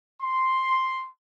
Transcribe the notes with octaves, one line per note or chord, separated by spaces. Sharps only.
C6